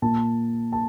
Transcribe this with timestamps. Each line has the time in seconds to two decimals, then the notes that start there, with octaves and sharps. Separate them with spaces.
0.02 A#2 A5
0.72 A5